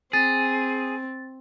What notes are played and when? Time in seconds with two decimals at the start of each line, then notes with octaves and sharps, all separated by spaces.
0.13 C4 G#4 A6